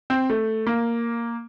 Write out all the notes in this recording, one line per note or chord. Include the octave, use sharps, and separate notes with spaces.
C4
A3
A#3